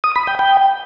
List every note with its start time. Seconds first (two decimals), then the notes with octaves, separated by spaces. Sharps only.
0.04 D#6
0.16 B5
0.27 G5
0.39 G5